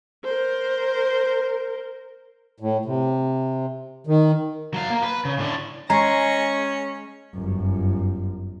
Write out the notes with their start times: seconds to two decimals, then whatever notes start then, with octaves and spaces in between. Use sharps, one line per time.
0.25 A#4 C5
2.60 A2
2.85 C3
4.07 D#3
4.74 F#3 F5
4.90 A#3
5.03 B4
5.25 C#3
5.38 A2 D3
5.90 G#3 C#4 A#5 C#6 A#6
7.35 G1 F#2